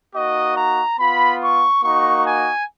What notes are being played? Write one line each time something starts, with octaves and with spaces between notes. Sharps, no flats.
A#3 D#4 F#4 D#5
A#5
B3 F4 B5
C#6
A#3 D#4 F#4 C#6
G#5